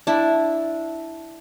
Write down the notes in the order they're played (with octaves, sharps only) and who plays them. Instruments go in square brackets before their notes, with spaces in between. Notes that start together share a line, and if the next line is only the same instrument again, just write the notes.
[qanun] D4 E4